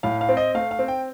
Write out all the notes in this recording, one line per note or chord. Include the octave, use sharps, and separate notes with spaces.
A2 F5
F5
C4
D#5
A3 F5
F5
C4
G5